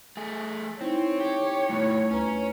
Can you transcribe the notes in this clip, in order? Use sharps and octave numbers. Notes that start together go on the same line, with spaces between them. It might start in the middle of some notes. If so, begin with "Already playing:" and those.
A3 G#4
C4 D#4 E4 C#5
G4
G2 B2 A3 E4
D2 C#4 B4 A#5